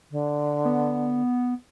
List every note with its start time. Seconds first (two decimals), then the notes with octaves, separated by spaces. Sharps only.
0.11 D3
0.65 B3